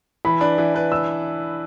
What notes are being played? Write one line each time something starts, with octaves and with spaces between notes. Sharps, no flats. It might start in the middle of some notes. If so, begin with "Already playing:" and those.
E3 B5
D4 B4
E3
D4 B4
E6